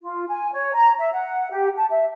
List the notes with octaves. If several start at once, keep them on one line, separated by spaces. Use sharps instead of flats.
F4
G#5
C#5
A#5
E5
F#5
G4
A5
E5